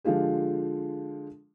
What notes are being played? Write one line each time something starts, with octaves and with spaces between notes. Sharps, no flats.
D3 F3 G#3 F4 G4